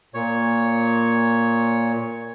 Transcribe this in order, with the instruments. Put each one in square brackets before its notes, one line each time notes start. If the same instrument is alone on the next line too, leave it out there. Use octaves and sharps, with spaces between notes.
[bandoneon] A#2 C#5